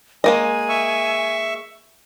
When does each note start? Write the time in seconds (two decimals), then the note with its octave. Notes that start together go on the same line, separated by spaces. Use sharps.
0.24 G#3 A#3 D#5 G#5
0.69 E5 C#6 E6